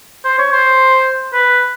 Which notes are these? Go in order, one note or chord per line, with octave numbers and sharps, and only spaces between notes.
C5
C#5
C5
B4